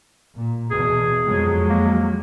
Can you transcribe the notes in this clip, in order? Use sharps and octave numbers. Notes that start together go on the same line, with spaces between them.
A#2
E2 B2 G#4
F2 F#3 G#3
A#3